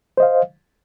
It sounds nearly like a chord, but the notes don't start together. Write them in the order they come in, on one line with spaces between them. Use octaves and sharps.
C5 D#5 F5